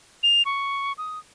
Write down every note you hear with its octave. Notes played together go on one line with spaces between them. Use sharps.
F7
C#6
D#6